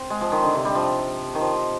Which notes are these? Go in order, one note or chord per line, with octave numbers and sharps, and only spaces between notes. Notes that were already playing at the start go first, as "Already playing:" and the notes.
Already playing: C4
G#3
F3
D#3
D3
C3
G3
F3
D#3
F3